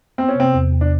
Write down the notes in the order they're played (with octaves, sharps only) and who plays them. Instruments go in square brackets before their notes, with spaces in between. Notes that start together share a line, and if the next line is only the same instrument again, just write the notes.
[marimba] B3 [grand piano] C4
[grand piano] C#4
[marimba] C3 [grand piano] C4
[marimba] E2
E2
[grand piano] D4